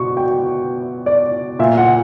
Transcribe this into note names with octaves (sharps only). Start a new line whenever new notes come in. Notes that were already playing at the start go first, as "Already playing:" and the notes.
Already playing: B2 C#6
G5
D5
A#2 E5
F#5